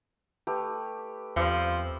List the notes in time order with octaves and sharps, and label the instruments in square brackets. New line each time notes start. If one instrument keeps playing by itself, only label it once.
[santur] A3 G4 B4
[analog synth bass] E2 [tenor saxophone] F3 [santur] G3 C4